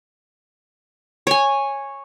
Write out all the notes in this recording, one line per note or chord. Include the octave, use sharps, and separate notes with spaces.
C#5 G#5